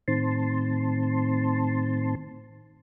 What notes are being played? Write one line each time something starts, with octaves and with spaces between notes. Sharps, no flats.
A2 D#3 C4 A5 C6